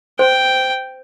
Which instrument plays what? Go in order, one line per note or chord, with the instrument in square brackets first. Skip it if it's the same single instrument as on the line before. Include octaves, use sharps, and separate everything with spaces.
[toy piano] C5 [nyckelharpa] G5